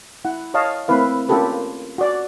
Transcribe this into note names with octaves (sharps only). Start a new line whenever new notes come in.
E4 F#5
C#5 D#5 F5 A5
A3 A#3 C4 E4 B4 F5
A#3 C#4 F4 G4 A4 B4
F#4 D5